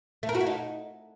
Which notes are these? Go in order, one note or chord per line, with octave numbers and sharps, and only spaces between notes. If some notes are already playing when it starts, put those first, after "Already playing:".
A3
A#4
F#4
E4
D#4